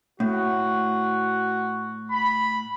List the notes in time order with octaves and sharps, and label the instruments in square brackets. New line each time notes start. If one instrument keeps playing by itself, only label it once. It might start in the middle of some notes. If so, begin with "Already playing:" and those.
[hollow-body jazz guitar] A2 [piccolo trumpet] F#4
[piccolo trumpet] B5